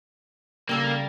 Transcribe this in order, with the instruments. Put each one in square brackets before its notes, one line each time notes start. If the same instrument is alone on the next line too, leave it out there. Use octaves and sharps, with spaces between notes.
[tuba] C#3 [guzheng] G3 A4 [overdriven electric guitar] A#3